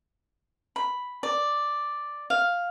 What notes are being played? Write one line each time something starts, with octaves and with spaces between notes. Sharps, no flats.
B5
D5
F5